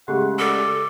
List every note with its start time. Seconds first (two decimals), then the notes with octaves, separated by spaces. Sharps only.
0.08 C#3 G#3 A3 G4 G#4 F#5
0.39 A4 D5